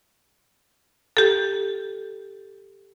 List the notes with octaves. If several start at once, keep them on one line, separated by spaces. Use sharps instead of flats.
G4 A4